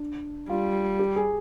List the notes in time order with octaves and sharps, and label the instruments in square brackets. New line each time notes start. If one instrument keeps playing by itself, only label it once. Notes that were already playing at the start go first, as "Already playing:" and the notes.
Already playing: [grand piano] D4
[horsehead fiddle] G3 [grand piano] F4
[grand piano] G4
G#4